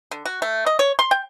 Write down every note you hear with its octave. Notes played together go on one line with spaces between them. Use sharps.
D3
F#4
A3
D#5
C#5
C6
G5